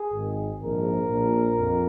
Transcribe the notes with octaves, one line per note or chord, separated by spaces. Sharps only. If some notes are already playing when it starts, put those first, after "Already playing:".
Already playing: G#4
G#1 G#2 D#3
A#1 G#2 F3 A#4
A#1 A#2 F3
F2